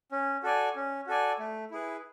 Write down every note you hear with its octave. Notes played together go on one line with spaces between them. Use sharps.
C#4
F#4 A4 D5 G#5
C#4
F#4 A4 D5 G#5
A3
E4 G#4 B4